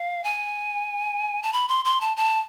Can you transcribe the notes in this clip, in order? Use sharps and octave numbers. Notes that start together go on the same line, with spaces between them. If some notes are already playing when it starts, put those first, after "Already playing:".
Already playing: F5
G#5
A5
B5
C6
C6
A5
A5